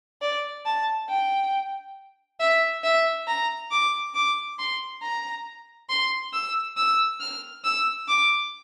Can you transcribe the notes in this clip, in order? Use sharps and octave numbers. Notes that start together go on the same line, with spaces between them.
D5
A5
G5
E5
E5
A#5
D6
D6
C6
A#5
C6
E6
E6
F6
E6
D6